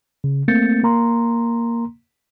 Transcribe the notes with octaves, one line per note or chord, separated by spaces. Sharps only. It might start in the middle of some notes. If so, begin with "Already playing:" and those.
C#3
A3 A#3 C4 G6 A6 C#7
A#3 A#5 C6